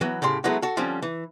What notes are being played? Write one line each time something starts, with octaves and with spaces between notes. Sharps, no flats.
E3 F#3 B3
A2 C#3 G4 C6
F#3 G#3 A3 B3 E4 F#4
F#4 A4
D3 F3 G3 C4 C#4
E3